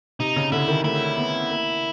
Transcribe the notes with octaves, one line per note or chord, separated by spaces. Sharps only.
C3 D#4
C#3
D3 E4
D#3
A3 E4
B3
A#3